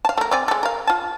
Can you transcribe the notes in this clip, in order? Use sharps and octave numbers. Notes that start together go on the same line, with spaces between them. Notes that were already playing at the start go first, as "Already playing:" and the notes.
F5 A5
A3 A#4
C4 D5 G#5
G#3 A4
A#4 F5
F4 A5